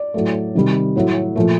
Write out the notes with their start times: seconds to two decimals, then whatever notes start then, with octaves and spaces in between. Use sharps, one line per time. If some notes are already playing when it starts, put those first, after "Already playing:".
Already playing: D5
0.14 A2 F#3 A3
0.55 C3 D#3 G3
0.96 A2 F#3 A3
1.36 A#2 F3 A3